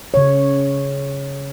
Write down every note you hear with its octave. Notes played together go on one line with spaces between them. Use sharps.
C#3 C#5